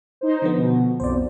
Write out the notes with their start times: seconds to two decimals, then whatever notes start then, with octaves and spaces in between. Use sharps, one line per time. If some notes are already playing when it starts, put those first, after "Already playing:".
0.21 D#4 C5
0.42 D3 F3 B3
0.56 B2
1.00 B1 F2 C5 D5